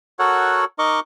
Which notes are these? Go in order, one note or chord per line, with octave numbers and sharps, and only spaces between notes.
F#4 A4 A#4 C#5 F#5
D#4 A#4 D#5 C#6 D6